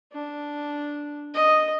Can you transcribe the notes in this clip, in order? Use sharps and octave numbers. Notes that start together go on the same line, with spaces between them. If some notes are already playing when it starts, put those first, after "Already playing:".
D4
D#5